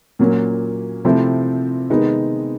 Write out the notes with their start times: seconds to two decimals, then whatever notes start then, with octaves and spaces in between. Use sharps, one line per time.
0.19 A#2 F#3 A#3 C#4
1.05 C3 F3 A3 C4 E4
1.90 C3 D#3 G#3 B3 D#4